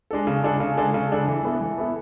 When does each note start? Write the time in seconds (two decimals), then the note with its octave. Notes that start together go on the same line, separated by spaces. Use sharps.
0.11 G#3 D4 A4
0.27 C#3
0.43 G#3 D4 A4
0.60 C#3
0.77 G#3 D4 A4
0.94 C#3
1.11 G#3 D4 A4
1.28 E3
1.45 B3 E4 A4
1.61 E3
1.78 B3 E4 A4